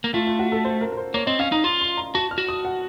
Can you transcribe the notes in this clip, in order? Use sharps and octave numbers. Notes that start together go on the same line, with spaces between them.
A#3
A3 F4
F4
F#4
A4
C5
A#4
A#4
C5
A#3 C#5
C4 D#5
C#4 F5
D#4 A#5
F4 C6
C6
A#5
F#4 A5
F6
F#4
D#6
F#5